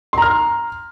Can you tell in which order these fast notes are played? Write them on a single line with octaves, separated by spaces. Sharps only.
C6 A#5 F6